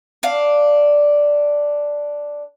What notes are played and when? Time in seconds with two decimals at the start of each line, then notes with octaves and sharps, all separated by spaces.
0.23 D4 F5